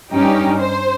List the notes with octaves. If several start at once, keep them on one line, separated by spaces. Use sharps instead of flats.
G2 C#4 D#4 G4
C5